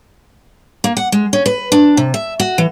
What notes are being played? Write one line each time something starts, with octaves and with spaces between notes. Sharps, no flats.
A#3
F#5
G#3
C#4
B4
D4
C3
E5
F#4
E3